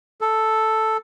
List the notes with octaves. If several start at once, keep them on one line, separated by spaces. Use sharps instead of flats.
A4